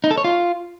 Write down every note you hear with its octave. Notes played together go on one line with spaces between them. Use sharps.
D#4
A4
C#5
F4